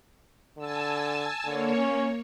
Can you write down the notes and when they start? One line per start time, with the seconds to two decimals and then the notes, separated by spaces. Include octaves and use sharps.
0.58 D3 G#5 A5 E6
1.44 D3 A#3 C#5
1.77 C#4